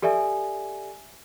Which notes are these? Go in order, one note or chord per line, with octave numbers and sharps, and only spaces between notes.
G4 A4 D5 E5 G#5